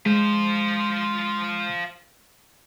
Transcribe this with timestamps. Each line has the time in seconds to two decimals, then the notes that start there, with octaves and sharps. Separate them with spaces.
0.06 G#3 F4 C5